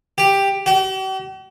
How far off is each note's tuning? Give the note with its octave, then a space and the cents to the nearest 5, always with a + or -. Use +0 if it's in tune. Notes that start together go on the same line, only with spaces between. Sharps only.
G4 +10
G4 -45